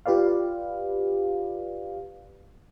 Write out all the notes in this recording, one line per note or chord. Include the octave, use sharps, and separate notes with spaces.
F4 G4 B4 D5 F5